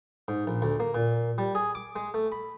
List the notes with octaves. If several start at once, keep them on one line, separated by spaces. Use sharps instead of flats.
G#2
A#1
D2
A#3
A#2
G3
G#4
D6
G#3
A3
B5